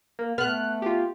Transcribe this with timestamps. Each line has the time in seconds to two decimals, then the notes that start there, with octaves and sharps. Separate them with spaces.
0.19 A#3
0.38 A3 B3 F6 F#6
0.82 F4 G4